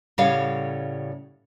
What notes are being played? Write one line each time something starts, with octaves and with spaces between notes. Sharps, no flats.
A2 C#3 G3 C#5 F5 F#5